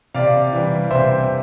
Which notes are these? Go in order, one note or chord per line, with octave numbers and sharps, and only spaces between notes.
C3 D5 F5
E3 G3
C3 C5 E5